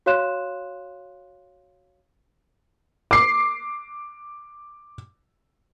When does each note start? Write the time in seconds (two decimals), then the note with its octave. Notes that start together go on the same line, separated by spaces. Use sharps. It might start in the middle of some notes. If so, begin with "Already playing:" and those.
0.06 F#4 C#5 F5 C6 F#6 E7
3.11 D6 C7